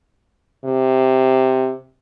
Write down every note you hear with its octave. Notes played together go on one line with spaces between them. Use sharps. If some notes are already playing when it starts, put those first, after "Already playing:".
C3